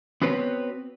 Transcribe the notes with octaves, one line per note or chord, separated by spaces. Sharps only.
B3 C4 F#4 B4 C#5